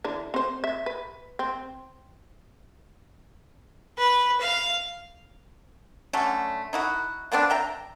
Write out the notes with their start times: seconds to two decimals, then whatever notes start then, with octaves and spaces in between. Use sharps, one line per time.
0.05 D3 E3 D4
0.34 C4 C5
0.64 E5
0.86 B4
1.39 C4
3.98 B4
4.41 F5
6.13 D3 F#3 A3 C#4
6.73 D#4 E4 F#4
7.32 F3 B3 C4 D4
7.50 E5 G5 A#5